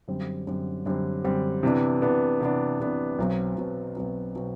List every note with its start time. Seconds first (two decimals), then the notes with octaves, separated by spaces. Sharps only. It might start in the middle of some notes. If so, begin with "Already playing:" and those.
0.08 F#2 D3 G3 C4
0.47 F#2 D3 G3 C4
0.86 F#2 D3 G3 C4
1.24 F#2 D3 G3 C4
1.63 C3 E3 B3 D4
2.02 C3 E3 B3 D4
2.40 C3 E3 B3 D4
2.80 C3 E3 B3 D4
3.18 B1 B2 F#3 C4
3.56 B1 B2 F#3 C4
3.95 B1 B2 F#3 C4
4.35 B2 F#3 C4